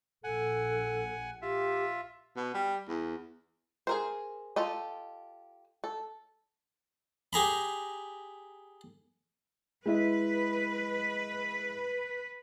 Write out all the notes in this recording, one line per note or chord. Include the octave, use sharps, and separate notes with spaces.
A#1 A4 F#5 G#5
F4 G4 E5
B2
G3
E2
G#4 A#4 C5
F4 G4 A4 D#5
A4
G4 G#4 A#5 B5
G#3 E4 B4 D#5